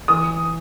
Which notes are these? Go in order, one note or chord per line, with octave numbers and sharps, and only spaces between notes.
E3 D#6